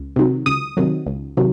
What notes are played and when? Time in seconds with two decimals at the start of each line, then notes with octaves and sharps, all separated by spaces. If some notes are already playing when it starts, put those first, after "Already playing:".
Already playing: C#2
0.16 C3 D#3 F#3
0.46 C#2 D#6
0.77 C3 D#3 F#3
1.07 C#2
1.37 C3 D#3 F#3